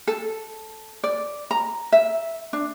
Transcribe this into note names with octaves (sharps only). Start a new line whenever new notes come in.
A4
D5
A#5
E5
D4